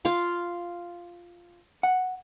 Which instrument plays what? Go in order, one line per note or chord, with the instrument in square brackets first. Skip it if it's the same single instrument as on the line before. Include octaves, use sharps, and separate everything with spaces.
[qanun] F4 F5 D6
[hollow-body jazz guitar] F#5